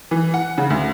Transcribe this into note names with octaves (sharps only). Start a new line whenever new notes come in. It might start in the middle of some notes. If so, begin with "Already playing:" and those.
E3
F#5
C#3
D2